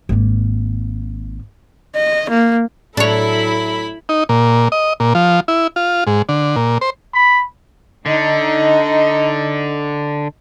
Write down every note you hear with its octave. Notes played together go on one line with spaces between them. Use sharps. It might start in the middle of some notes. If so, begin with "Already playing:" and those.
G#1 A#3
D#5
A#3
A2 F#3 D4 E4 A4 C#5 B5
D#4
A#2
D#5
A#2
F3
E4
F4
G#2
D3
A#2
C5
B5
D3 D#4